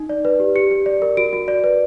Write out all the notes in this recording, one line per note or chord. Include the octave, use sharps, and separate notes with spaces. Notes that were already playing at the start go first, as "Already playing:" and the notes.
Already playing: D#4
D5
B4
G4
G4 C#7
G4
D5
A#4
F#4 D7
F#4
D5
B4